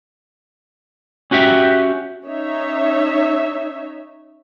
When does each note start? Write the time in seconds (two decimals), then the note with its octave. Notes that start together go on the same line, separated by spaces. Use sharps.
1.31 C#4 F#4 G4 E5
2.24 C#4 D#4 C#5 E5